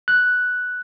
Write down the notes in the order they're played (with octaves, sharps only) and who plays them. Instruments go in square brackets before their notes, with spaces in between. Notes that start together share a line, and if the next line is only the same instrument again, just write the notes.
[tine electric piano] F#6